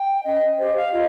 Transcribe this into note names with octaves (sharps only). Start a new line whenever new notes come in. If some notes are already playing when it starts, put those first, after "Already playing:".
Already playing: G5
C#4 D#5
G4 C5 D#5
F5
F4 D#5